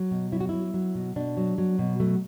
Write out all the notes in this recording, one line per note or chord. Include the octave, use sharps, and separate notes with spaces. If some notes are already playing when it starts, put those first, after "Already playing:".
Already playing: F#3
B2
F#3 E4
F#4
F#3 E4
F#3
B2
B2 D4
F#3
F#3
B2
F#3 A3